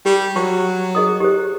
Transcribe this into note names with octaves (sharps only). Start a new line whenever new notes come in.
G3 G4
F#3 C#6
G#4 D#5 D#6
G4 C5